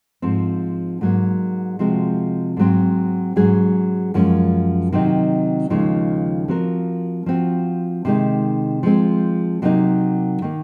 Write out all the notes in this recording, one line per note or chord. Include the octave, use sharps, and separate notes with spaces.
G#2 F3 C4
G#2 F#3 A#3
C3 F3 G#3 C4 F#4
G#2 F#3 C4
G#2 F#3 C#4 G#4
F#2 F3 G#3 C#4
C3 D#3 F#3 C4 D#4
D#2 C#3 F3 G#3 D#4
F3 C4 F#4 A#4
F3 C4 F#4
C3 D#3 G#3 D#4
F3 G#3 C4
C3 F#3 A#3 D#4
D#3 A#3